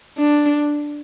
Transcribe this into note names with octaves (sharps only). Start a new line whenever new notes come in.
D4